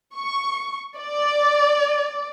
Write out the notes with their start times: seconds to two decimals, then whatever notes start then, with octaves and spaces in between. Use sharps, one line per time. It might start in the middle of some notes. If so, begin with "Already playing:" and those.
0.15 C#6
0.98 D5